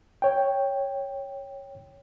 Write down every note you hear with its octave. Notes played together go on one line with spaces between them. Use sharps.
C#5 G5